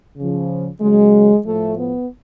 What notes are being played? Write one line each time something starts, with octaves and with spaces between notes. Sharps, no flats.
C#3 F3
C#3 F#3 G#3
A2 F3 A3
B3